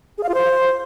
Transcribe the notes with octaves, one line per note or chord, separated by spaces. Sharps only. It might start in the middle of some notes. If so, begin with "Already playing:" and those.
G#4
F5
F4
C5